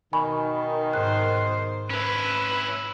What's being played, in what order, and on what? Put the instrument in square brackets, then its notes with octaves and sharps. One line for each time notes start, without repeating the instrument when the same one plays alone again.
[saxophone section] B2 D#3 [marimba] G#5 B5 C#6
[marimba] G#2 F#6 [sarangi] C5
[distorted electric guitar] C#4 E4 [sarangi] B4